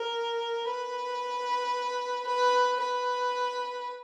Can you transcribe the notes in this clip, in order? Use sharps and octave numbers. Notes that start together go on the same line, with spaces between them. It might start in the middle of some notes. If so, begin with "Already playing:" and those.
Already playing: A#4
B4
B4
B4